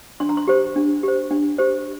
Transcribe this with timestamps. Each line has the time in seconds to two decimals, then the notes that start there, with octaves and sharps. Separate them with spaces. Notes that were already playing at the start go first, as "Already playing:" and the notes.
0.20 D4 C6
0.29 A#5
0.37 C6
0.47 G4 C5
0.76 D4
1.03 G4 C5
1.31 D4
1.59 G4 C5